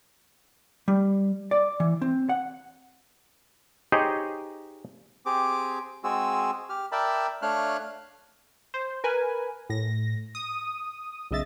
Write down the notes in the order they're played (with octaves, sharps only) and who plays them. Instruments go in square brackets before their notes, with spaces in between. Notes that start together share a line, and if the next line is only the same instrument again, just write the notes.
[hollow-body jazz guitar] G3
D5
E3
C4
F#5
[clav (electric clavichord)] D#4 G4 G#4 C5 C#5 D#5
[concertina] C4 G4 G#4 D6
G#3 C4 F#4 G#4 E6
G4 F6
A#4 D5 E5 G5 A5 B5
A3 D4 C#5 F5 F6 F#6
[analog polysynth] C5
A#4 B4 G#5
A2 A#6
D#6
B1 C#3 D#5 E5 A6